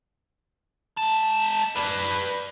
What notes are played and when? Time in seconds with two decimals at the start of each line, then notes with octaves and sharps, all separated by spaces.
0.97 G#3 A5
1.76 B4 D5